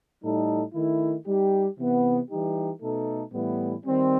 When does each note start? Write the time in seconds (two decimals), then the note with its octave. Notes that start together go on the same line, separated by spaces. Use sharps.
0.21 A2 G3 D#4 A4
0.73 D#3 A3 E4
1.26 G3 D#4 G4
1.76 C3 E3 B3
2.29 E3 G3 D#4 G4
2.80 B2 A3 D#4 A4
3.32 A2 E3 G3 B3 E4
3.85 D#3 G3 C4